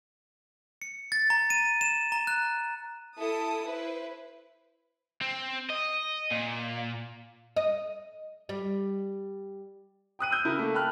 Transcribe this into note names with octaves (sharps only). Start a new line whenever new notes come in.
C#7
A6
A#5
D#7
E7
A#5
F#6
E4 A4 D#6
E4 B4 C5
C4
D#5
A#2
D#5
G3
G5 D#6 F#6 D#7
E6 G6
C#3 E4 A#4
A3 A#3
G5 A5 B5 F6 F#6